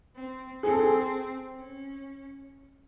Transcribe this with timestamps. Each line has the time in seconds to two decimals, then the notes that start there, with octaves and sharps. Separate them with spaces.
0.16 C4
0.63 C4 G#4
0.72 A4
0.80 G#4
1.57 C#4